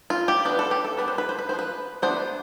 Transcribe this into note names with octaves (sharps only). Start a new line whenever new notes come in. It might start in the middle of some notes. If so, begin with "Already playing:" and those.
F4
G4
E3 B3 D4 B4
A4
G4
A4
G3 B3 D4 B4
C5
B4
C5
B4
C4 C5
F3
B4
E3 B3 D4 C5